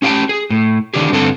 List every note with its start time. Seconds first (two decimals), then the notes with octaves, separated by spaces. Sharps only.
0.02 C#4 G4 F5 G5 A5
0.29 G#4
0.50 A2
0.94 D3 D#3 D4 G4 G#4
1.12 G2 D3 C4 A4 A5